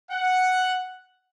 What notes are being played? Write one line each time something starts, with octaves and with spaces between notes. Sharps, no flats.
F#5